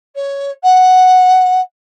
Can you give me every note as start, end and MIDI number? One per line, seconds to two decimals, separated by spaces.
0.15 0.51 73
0.63 1.60 78